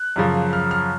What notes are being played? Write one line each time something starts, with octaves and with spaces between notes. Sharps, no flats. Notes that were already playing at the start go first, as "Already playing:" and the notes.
Already playing: F#6
F#2 C#3 F3
F6
F6